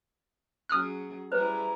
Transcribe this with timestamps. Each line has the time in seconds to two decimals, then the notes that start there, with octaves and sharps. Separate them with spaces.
0.69 F#3 C#4 G#4 D#6 F6 F#6
1.32 G3 E4 G#4 B4 C5 A#5